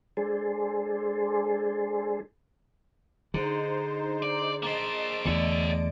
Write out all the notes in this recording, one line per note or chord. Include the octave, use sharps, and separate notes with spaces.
G#3 D4 G#4 A4 C5
D3 D4 D#4 G#4 C5
D5
A#3 C5 D#5 A5 D7
E2 D3 A3 C#5 D5 E5